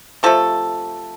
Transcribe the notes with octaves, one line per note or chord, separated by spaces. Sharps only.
C3 F3 A3 A4